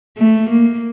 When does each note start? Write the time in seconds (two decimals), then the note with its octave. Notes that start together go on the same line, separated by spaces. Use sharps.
0.18 A3
0.50 A#3